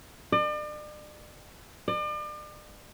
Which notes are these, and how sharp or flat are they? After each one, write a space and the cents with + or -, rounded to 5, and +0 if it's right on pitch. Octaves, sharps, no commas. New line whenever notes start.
D5 +40
D5 +40